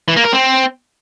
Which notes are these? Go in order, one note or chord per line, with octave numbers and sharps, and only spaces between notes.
E3
A#3
A#4
C4